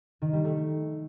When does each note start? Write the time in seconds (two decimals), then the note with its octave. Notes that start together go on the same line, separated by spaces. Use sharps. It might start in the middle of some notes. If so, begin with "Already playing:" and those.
0.22 D#3
0.33 G3
0.44 A3